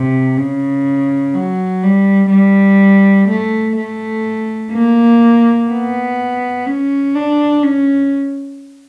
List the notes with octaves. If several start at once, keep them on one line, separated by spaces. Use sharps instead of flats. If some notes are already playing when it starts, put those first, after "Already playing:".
Already playing: C3
C#3
F#3
G3
G3
A3
A3
A#3
B3
C#4
D4
C#4